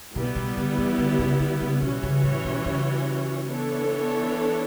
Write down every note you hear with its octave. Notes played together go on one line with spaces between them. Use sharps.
B2 G3 B3 E4
B2
D3
E3
D3
C#3
D3
C#3
B2 E3 G3 C#4 F#4 C#5
C#3
A2
B2
C#3
E3 B3 D4 A4 C#5